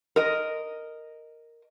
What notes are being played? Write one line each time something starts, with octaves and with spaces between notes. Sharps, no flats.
A#4 D#5